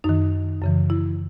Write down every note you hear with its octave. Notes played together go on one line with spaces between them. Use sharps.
F#2 D#3 D#4
F#2 C#3 E3
E4